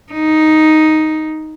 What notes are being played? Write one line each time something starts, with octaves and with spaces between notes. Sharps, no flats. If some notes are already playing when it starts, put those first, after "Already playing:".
D#4